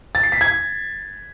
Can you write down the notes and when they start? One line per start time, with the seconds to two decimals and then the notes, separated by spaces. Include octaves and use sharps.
0.15 A6
0.23 C7
0.32 B6
0.41 G#6